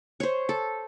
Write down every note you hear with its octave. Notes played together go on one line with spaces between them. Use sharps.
C5 C#5
A4